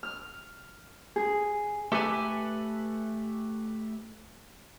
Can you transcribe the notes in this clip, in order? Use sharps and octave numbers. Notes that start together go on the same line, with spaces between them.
F6
G#4
A3 G4 A4 B4 G#5